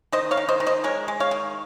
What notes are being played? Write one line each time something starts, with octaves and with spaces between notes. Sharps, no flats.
D#3 C5 D#5
C#5 F5
D#3
C5 D#5
D#3
C5 D#5
G#3 A#4 C#5
G#3
C#5 F5
D#3